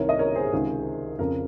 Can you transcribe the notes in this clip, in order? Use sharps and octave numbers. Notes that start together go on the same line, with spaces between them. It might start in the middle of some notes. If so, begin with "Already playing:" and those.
Already playing: C2 C3 D#3 A#4 C#5
D#5
A#4 C#5
G#4 C5
C#2 C3 D#3
F2 C#3 A#4